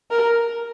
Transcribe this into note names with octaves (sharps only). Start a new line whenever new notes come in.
A#4